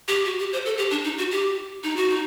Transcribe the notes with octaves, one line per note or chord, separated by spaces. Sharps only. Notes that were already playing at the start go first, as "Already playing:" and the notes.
G4
F#4
G4
C5
A4
G4
D4
D#4
F#4
G4
D#4
F#4
D#4